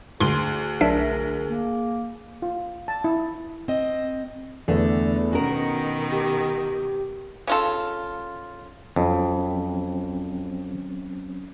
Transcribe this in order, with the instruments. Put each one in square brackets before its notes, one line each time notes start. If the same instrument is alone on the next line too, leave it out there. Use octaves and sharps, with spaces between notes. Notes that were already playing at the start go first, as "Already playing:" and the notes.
[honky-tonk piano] D2 [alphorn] G#4 [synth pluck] C6
[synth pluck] B1 D4 E5 [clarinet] A#4
[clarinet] A#3
[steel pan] F4
A5
E4
[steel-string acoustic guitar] C4 D#5
[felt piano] E2 A3 B3 [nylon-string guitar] D3
[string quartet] B2 D#3 [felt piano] C#4 [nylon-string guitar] F#4 A#4
[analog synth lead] G4
[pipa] C#3 F4 A4
[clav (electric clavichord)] F2 [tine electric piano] F#3 C4 C#4